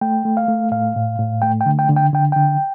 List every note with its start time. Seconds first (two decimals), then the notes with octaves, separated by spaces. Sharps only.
0.01 A3 G5
0.25 A3
0.37 F5
0.48 A3
0.71 A2 F5
0.96 A2
1.19 A2
1.42 A3 G5
1.61 G5
1.66 D3
1.79 G5
1.89 D3
1.96 G5
2.13 D3 G5
2.32 D3 G5